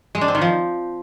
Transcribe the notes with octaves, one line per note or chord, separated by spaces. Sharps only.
G#3
D4
C4
D#3
F3